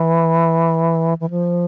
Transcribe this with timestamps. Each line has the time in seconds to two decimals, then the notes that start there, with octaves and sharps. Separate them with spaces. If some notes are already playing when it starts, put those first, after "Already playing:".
Already playing: E3
1.20 E3
1.30 F3